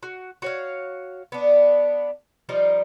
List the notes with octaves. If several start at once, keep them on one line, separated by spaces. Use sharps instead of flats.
F#4
F#4 C#5 F5
B3 D4
F3 G3 D#4